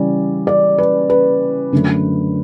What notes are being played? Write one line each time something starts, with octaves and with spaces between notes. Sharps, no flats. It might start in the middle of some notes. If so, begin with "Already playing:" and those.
Already playing: C#3 E3 G3 C#4 D5
D5
B4
B4
F#2 D3 F#3 A3